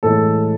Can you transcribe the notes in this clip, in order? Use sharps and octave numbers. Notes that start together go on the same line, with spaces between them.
A2 E3 G#3 A4